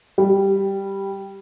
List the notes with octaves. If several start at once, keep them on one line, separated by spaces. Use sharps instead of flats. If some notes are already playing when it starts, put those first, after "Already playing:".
G3